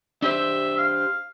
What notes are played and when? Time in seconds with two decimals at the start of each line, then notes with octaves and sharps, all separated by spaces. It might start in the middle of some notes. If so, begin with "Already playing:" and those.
0.22 D4 G4 C5 E5
0.77 F5